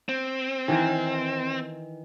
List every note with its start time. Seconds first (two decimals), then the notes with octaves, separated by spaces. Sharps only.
0.09 C4
0.68 D#3 E3 A#4